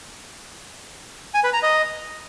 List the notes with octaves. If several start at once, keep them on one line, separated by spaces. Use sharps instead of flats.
G#5
B4
A#5
D#5